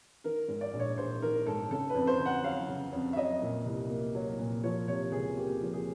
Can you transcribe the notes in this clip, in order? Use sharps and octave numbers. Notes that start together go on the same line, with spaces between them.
D#3 A#4
G#2
D5
A#1
C#5
A#1 C5
D#3 A#4
G#2 A4
C#3 A4
B4
F2
C5
G1
F#5
F#3 F5
C#3
F2
E5
F#3 D#5
A#2
C2
A#3
F#3
A#2
F3 C#5
C3 C#5
C#2 G#4
A#3 G4
F3
G#4